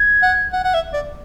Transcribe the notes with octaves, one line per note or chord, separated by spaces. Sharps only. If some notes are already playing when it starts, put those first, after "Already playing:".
Already playing: G#6
F#5
F#5
F#5
E5
D5